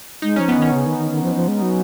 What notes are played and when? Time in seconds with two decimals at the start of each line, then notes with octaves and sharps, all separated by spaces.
0.22 G#3 D#4
0.36 F3 C#4
0.48 B3
0.56 D#3
0.62 C#4
0.74 C#3
0.86 D#3
0.98 D#3
1.11 D#3
1.23 F3
1.35 F3
1.48 G#3
1.62 F#3